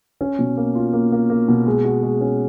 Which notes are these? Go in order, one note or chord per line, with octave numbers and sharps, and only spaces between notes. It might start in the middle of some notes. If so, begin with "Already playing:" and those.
C#4
B2
A#3
F4
A#3
A#3
A#3
B2
G#3
F#4
G#3
C#4